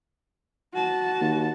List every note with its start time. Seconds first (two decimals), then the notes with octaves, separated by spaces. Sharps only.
0.74 F#4 A5
1.21 D#2